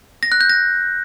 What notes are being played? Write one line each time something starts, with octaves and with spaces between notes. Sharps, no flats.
A#6
F#6
G6
A#6